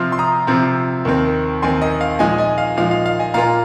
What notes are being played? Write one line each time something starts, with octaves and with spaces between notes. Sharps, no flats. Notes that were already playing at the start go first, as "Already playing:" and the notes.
Already playing: C3 F3 C4 F4 C6 F6
C6
A#5 D#6
C3 F3 C4 F4
D#2 D#3 C4
D#2 D#3 C4 G#5 C6
D#5
F5
A#2 F3 G#3 D#4 D#5 G#5
D#5 G#5
F5
A#2 F3 G#3 D#4 F5
F5
F5
D#5 G#5
A#2 A#3 F4 F5 A#5